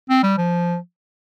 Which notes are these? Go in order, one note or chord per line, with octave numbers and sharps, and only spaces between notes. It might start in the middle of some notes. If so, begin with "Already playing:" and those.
C4
G3
F3